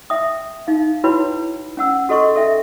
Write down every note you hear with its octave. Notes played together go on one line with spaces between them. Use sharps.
E5 G5 D#6
D#4 F5
E4 F#4 B4 C#5 G5 B5
C#4 F#5 E6
F#4 A4 D#5 C6 C#6
A4 E5 G5